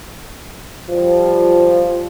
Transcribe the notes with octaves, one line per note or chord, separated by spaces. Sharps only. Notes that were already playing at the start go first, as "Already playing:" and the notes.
F3 G3